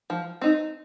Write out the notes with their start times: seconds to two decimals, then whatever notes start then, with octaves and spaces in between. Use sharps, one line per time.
0.10 F3
0.42 C4 D#4